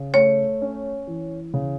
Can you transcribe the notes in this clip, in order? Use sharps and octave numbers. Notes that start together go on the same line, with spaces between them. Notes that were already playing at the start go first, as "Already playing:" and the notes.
Already playing: C#3
A3 C#5
C#4
E3
C#3